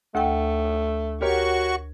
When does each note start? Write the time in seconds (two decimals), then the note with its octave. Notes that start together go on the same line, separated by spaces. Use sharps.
0.15 D2 A3 G5
1.21 F#4 G4 A#4 C#5 C#6